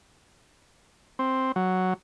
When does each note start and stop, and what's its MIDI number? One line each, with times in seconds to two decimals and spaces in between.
1.19 1.52 60
1.56 1.94 54